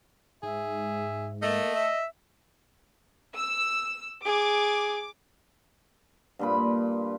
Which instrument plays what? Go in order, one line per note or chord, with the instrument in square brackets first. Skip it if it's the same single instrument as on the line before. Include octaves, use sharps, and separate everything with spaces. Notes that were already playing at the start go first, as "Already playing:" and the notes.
[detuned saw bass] G#2 [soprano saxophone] G#4 [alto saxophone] E5
[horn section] A3 [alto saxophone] A#3 [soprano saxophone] D#5
[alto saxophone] E5
[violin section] E6
[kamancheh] G#4 [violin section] D6
[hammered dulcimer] G2 A#2 B5